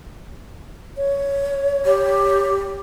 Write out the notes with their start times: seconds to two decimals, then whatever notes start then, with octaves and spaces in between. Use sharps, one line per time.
0.97 C#5
1.85 G4